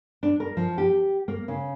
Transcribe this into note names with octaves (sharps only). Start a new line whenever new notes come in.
D4
A#4
F3
G4
A#3
C#3